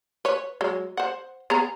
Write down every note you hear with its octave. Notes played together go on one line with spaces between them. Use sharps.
B4 C#5
F#3 G#3
C5 F#5
B3 G#4 A#5